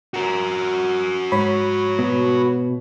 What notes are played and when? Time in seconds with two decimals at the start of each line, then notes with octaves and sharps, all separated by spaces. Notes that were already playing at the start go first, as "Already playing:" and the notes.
0.14 F#4 A#4
1.32 G#2 C#5 B5
1.99 B2